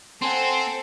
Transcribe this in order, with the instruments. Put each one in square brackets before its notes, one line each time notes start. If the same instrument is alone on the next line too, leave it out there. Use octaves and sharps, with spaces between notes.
[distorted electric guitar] C4 [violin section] A4 C5 [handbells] F#5 G#5 C6